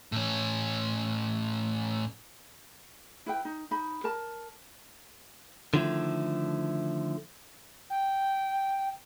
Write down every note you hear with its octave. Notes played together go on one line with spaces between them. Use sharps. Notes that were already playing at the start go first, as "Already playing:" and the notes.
A2 C#4
E4 B4 G5
D#4
D#4 B5
A#4 A5
D3 D#3 F3 A3 E4
G5